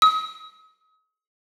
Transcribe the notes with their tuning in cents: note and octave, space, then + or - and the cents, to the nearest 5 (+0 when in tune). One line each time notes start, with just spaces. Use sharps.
D#6 +40